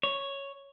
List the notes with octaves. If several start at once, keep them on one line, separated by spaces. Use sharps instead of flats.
C#5